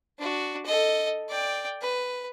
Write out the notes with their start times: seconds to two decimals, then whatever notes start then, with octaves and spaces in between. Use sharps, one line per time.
0.19 D4 F#4
0.66 A4 D#5
1.29 D5 G5
1.81 B4